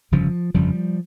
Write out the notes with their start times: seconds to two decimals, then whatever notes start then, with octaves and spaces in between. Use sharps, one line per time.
0.12 G1 F2 C#3 F3
0.54 G1 F2 C#3 F3 G3